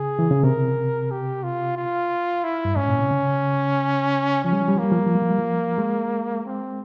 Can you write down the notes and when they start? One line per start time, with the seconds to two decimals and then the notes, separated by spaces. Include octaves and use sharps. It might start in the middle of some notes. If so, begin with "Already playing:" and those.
Already playing: C#3 G#4
0.19 E3
0.31 C#3
0.44 C3 A#4
1.11 G4
1.44 F4
1.77 F4
2.44 E4
2.65 G2
2.76 G#2 C#4
2.88 A#2
2.99 C3
3.11 C#3
4.45 F3 C#4
4.53 G3
4.61 F3
4.68 G3
4.75 F3
4.79 A#3
4.84 G3
4.91 F3
4.99 G3
5.07 F3
5.15 G3
5.22 F3
5.30 G3
5.39 F3
5.78 G#3
6.46 C4